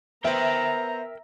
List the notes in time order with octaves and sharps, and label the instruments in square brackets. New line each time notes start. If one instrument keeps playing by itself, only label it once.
[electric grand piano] B3 C5 [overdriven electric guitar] A#4 G5 [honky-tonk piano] E5 [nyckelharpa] A#5